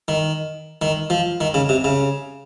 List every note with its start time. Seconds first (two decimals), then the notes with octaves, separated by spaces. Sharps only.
0.08 D#3
0.82 D#3
1.10 F3
1.41 D#3
1.54 C#3
1.69 C3
1.84 C#3